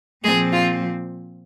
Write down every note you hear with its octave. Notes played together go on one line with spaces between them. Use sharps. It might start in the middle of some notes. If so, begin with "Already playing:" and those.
A#2 F3 G#3 C4 G#4
F4